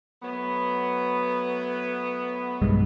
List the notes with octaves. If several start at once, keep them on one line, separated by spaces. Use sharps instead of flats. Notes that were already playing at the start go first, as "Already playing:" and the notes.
F#3 A3 B3
B1 G2 G#3